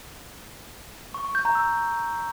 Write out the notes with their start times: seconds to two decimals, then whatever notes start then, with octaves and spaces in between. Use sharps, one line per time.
1.14 C#6
1.25 C#6
1.35 G6
1.45 A#5
1.55 E6